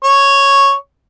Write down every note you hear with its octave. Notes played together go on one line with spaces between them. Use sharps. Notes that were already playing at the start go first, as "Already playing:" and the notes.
C#5